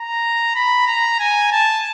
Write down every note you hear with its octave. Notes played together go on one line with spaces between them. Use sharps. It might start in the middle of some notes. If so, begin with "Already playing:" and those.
Already playing: A#5
B5
A#5
G#5
A5